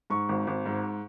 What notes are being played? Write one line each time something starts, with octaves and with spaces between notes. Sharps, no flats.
G#2 C#6
G#1
G#1
G#2